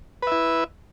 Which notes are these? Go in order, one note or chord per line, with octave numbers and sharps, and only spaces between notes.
E4 B4 E5